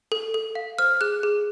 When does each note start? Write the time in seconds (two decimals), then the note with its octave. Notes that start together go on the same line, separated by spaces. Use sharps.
0.12 A4
0.34 A4
0.55 F5
0.79 C5 F6
1.01 G#4 F#6
1.23 G#4